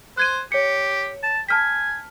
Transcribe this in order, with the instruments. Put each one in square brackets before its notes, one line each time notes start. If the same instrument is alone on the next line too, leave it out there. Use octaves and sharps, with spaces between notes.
[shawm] C5 [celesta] F#6 G#6 D#7
[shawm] G4 [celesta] C#5 C#7
[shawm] A5
[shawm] G#5 [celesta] A5 F6 B6